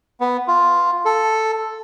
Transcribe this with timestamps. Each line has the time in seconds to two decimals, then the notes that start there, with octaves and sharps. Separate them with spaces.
0.21 B3
0.48 F4
1.05 A4